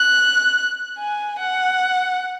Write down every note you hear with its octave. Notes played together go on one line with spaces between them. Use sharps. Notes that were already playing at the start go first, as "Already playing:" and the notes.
Already playing: F#6
G#5
F#5